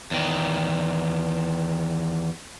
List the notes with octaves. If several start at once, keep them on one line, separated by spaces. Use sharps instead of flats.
E2 D#3